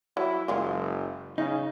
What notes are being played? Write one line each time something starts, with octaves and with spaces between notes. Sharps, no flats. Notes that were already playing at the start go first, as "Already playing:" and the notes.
F#3 E4
F#1 F#3 G#3 F4
C#3 D#4